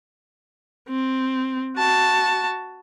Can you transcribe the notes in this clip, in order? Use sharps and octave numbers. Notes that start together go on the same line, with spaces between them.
C4
F#4 A5